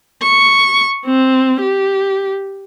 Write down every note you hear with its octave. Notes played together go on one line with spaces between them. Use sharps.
C#6
C4
G4